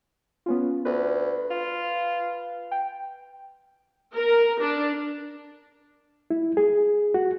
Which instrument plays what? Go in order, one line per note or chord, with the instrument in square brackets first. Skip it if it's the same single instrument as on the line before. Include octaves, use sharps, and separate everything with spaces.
[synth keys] B3 C#4 F4
[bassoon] D2 [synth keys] B4
[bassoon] F4
[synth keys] G5
[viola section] A#4
D4
[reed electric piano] E4
G#4
F#4